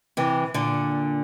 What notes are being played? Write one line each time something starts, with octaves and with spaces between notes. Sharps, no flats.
C3 E3
A#2 D3